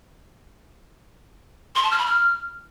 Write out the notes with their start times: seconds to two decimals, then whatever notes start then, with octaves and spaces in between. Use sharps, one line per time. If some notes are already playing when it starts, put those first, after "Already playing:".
1.76 C6
1.83 A5
1.91 F6
1.99 B5
2.06 F6